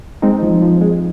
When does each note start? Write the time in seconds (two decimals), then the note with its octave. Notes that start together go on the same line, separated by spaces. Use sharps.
0.22 G#3 C4 D#4
0.42 F3
0.62 F3
0.81 G#3